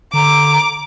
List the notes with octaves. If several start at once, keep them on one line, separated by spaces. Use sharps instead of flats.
D3 A#5 D6